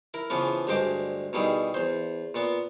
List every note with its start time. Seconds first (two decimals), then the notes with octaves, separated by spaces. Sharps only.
0.14 E4 A#4
0.30 C#3 E3 F3 B3
0.67 D2 G2 G#3 C5 D6
1.33 B2 D#3 G3 E4 G#4
1.74 E2 C5
2.34 A#2 B3